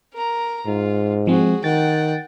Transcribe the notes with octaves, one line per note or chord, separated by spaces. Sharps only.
A#4 A#5
G#2 F4
F3 G#3 C4 F#4 G#4
D#3 F#5 G5 A6